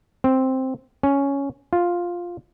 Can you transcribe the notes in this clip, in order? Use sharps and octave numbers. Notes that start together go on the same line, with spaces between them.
C4
C#4
F4